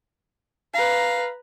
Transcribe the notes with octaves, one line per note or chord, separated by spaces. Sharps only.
B4 F5 A#5